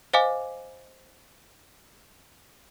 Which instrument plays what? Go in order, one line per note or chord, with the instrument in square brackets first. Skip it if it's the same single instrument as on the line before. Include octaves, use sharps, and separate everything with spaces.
[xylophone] C5 D#5 F5 G#5 D6